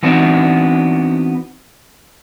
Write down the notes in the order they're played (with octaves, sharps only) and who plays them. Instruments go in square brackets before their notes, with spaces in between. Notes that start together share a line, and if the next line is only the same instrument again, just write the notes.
[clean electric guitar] E3 B3 C4 D4 D#4 F#4